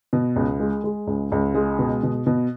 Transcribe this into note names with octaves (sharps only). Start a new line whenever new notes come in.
B2
C#2
G#3
G#3
C#2
C#2
G#3
B2
B2
B2